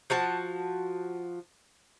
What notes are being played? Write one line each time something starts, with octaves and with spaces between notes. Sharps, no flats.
F3 F#4 A5